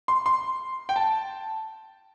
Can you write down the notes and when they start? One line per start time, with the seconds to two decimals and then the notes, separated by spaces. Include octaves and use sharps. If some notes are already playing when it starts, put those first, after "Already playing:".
0.08 C6
0.26 C6
0.89 G5
0.96 A5